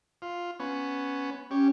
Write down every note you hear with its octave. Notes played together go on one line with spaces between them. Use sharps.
F4
B3 C#4
C#4 G4 C#5